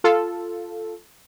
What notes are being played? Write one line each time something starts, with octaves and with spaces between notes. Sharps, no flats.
F4 A4